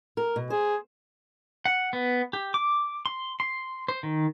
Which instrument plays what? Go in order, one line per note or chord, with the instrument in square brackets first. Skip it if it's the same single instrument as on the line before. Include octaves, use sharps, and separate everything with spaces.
[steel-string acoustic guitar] A#4
B2
[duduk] G#4 [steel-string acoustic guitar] C5
[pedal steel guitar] F#5
B3
G4
D6
C6
C6
C5
D#3